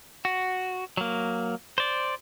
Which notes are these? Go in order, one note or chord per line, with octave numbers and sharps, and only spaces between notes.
F#4
F#3 A#3
C5 D5